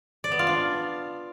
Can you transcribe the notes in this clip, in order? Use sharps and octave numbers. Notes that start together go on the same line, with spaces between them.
D5
B3
F4
D4